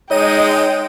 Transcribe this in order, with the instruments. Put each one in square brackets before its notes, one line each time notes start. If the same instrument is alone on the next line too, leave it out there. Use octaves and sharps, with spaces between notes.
[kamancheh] G#3 G5 [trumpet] D#4 [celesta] C#5 [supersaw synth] D#5 D#7